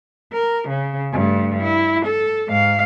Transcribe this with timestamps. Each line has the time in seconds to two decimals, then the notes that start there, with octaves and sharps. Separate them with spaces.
0.33 A#4
0.69 C#3
1.12 G2 A3
1.63 E4
2.06 A4
2.48 G#2 F5